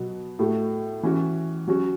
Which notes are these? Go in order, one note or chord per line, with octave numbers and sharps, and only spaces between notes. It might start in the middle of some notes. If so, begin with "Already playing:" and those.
Already playing: B2 F#3 B3
A2 A3 F#4
E3 C#4 F#4
F#3 C#4 F#4